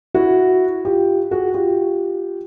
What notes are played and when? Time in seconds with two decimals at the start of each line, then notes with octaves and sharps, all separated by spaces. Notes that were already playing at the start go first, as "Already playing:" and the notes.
0.14 E4 F#4
0.85 F4 G4
1.31 F#4 G#4
1.54 F4 G4